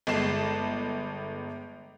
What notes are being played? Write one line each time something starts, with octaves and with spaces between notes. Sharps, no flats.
G1 G#3 D#5 A5 C7 E7